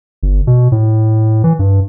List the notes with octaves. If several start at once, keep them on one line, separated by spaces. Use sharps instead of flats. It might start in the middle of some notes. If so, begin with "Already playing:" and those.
G1
B2
A2
E3
G2